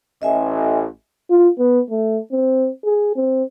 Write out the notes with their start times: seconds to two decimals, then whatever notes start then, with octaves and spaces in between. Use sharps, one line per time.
0.22 A1 D#5 E5 G#5
1.30 F4
1.59 B3
1.91 A3
2.32 C4
2.85 G#4
3.16 C4